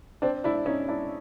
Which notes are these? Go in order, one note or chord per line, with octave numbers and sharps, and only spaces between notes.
C4 D4
D4 E4
C#4 D#4
D4 E4